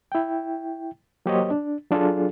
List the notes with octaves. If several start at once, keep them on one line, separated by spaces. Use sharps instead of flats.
E4 G5
F#3 A#3 G4 C5 C#5 D#5
D4
F#3 D4 F4 G#4 A4